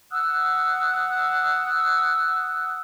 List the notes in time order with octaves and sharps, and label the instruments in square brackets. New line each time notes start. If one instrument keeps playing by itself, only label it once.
[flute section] F#5 D#6 E6 F#6